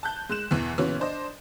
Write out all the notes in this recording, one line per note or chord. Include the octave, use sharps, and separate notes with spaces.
A5 F#6 G6
G#3 F#6 E7
E2 B2 E3
A#2 C#3 E3 B3 F#4 C#5
D4 C5 D#5